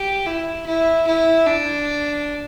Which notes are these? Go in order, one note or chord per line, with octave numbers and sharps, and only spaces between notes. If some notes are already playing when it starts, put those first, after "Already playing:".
Already playing: G4
E4
E4
E4
D4